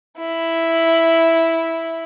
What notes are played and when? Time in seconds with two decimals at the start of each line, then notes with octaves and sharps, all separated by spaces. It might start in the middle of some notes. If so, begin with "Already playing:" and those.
0.18 E4